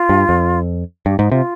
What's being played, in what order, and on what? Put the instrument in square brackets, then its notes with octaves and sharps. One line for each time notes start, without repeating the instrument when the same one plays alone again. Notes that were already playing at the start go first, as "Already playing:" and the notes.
Already playing: [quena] F4
[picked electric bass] G2
F2
[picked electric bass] G2 [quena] G4
[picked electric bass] G#2 [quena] D#4
[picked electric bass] C3 [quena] F4